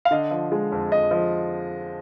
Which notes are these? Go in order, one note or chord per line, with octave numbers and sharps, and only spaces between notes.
F5
D3 D#5
F3
G#3
F2
F2 D#5
F3